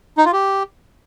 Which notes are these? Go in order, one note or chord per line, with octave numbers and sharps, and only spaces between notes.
D#4
F4
G4